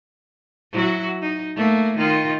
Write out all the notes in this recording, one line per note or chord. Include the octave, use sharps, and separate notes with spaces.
F#3 E4 F#4
D#4
A3 A#3
D#3 F4